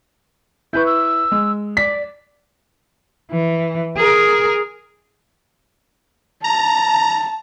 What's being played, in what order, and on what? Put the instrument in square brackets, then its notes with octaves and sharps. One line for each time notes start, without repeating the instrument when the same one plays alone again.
[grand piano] E4 B4 C#6 [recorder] G6
[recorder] E6
[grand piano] G#3
[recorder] D5 [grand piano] B6
[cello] E3
G#4 A#4
[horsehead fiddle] A5 [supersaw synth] A#5